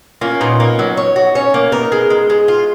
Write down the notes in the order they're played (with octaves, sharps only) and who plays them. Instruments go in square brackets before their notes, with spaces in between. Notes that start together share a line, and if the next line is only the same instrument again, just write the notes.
[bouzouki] A#3 [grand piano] C#4 F4
[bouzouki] A#2 [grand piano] B3 D#4
[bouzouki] A#3
F#3
C#5
F#4
[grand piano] C#4 [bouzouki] C#5
[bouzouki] A#3
[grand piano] B3 D#4 [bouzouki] A#4
[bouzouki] G#3
G#3
G#3
F4